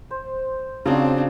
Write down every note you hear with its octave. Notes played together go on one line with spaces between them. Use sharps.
C5
C#3 F3 F#3 C4 D4